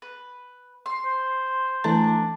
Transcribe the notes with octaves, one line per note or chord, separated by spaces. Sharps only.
B4
C6
C5
E3 A3 D4 A#5